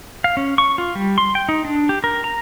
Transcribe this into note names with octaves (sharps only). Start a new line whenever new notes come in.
F5
C#4
C#6
F4
G3
C6
G5
D#4
D4
G4
A#4
A#5